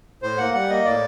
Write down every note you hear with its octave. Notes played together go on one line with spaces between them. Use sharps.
A2 C5
A#3 F#5
G3 F#5
A#3 D#5
A2 D5